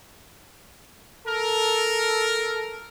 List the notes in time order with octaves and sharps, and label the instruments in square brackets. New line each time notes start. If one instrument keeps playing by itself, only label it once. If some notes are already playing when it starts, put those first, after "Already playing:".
[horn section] A4 A#4